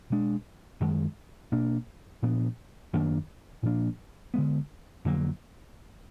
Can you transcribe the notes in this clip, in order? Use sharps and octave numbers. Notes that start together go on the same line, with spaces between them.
B2 G#3 D4
F#2 D#3 G#3
B2 A#3 D4
A#2 F3 B3 D4
F#2 D#3 A#3 D4
A#2 F3 A#3 D4
D3 G#3 B3
F2 D3 F#3 A#3